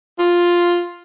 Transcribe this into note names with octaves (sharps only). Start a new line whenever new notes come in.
F4